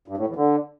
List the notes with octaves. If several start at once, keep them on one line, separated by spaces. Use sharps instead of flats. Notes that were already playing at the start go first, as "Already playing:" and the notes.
G2
A2
E2
D3